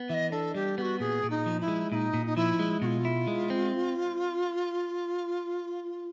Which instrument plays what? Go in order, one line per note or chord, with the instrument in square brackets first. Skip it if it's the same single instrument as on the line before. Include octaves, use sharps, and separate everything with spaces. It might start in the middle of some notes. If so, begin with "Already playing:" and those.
Already playing: [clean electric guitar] B3
[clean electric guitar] E3 [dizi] D#5 E5
[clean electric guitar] D4 [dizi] A4
[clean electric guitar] G3 [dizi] G4
[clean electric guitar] B3 [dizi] G4
[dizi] F#4
[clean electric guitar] A#2 [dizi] G#4
[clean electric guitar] A#2
[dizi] D#4
[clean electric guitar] F3
[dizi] E4
[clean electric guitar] G#3
[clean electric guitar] A#2 [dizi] D#4 E4
[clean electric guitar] A#2
[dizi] D#4
[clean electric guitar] F3 [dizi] E4
[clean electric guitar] G#3
[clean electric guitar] B2 [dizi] F#4
[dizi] F4
[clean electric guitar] E4
G#3
C4